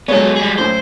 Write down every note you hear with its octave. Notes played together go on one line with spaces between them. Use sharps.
F#3 G#3 B3 A4 C#5
G3 G#4
F#2 A2 C5